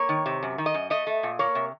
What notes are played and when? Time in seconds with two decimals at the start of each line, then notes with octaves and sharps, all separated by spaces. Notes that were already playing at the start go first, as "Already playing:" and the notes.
Already playing: A#3 C#5
0.09 D#3
0.26 C3
0.43 F#2
0.58 D#3
0.66 D#5
0.74 F#2
0.90 A3 D#5
1.07 A3
1.23 A#2
1.39 A#3 C#5
1.55 C3